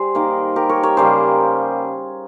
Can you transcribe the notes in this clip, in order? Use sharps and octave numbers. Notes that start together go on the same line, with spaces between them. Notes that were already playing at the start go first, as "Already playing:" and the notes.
Already playing: G3 G#4 C5
D#3 A#3
G4 A#4
A#4 C#5
A#4 C#5
C#3 G3 A#3 G#4 C5